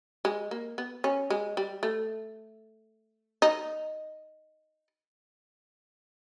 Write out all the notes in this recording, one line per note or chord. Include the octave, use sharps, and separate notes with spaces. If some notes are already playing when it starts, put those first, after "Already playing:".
G#3
A#3
B3
C#4
G#3
G3
A3
D#4